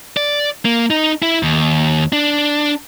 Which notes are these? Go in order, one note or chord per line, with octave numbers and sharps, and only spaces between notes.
D5
A#3
D#4
E4
D#2
D4